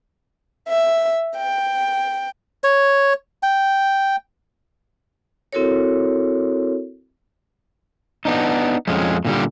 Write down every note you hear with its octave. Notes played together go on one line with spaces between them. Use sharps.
E5
G5
C#5
G5
C4 E4 F#4 A4 A#4 C#5
B3 D4 D#4
F2 G#3 C#4
A#2 D3 G3